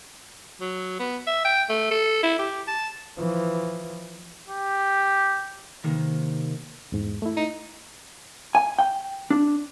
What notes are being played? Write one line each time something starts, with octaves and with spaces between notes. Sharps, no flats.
F#3
B3
E5
G5
A3
A4
E4
G4
A5
E3 F3
G4
C3 D#3 A#3
E2 G#2
A3 E4
D#4
G#5
G5
D4